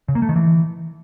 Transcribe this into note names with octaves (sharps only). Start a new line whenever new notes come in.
C#3
A#3
A3
D#3
E3